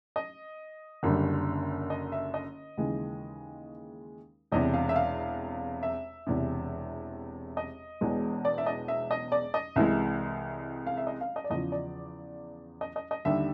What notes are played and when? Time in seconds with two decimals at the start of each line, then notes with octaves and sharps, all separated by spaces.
0.16 D#5
1.03 F#1 F#2 D3 G3
1.90 D#5
2.12 E5
2.34 D#5
2.77 D#2 C#3 E3 G#3
4.52 E1 E2 C3 D#5
4.74 F5
4.89 E5
4.96 F5
5.83 E5
6.27 E1 E2 C3
7.57 D#5
8.01 E1 E2 B2 G#3
8.45 D5
8.58 E5
8.66 D#5
8.88 E5
9.11 D#5
9.32 D5
9.54 D#5
9.76 C2 C3 E3 G#3 E5
10.87 F5
10.97 E5
11.07 D#5
11.21 F5
11.36 D#5
11.44 D5
11.50 E2 C#3 F3 D#5
11.72 D5
12.81 D#5
12.96 D#5
13.11 D#5
13.25 D#2 D3 G3 E5